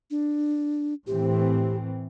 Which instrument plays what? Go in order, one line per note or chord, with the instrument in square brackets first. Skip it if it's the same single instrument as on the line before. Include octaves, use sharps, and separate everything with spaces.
[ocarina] D4
[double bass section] A2 E3 C4 [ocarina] G4